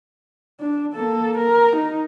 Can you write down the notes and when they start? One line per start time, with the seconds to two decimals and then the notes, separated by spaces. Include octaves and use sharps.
0.60 D4
0.94 A#3 A4
1.38 A#4
1.76 D#4